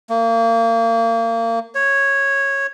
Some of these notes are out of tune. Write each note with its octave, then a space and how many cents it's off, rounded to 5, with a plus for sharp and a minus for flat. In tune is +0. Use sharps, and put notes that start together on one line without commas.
A#3 -30
C#5 -10